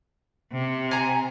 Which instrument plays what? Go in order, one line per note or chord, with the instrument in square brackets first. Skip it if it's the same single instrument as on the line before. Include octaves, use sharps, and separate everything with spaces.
[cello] C3
[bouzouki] G#5 A#5